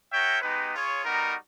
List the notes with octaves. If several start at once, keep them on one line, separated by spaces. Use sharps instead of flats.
F#4 A#4 C#5 E5 G5
G#3 B3 D#4 G4 B4
F4 G#4 C#5
G3 B3 D#4 F#4 A#4